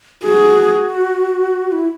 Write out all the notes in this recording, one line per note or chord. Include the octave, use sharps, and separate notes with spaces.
F#4 G#4
E4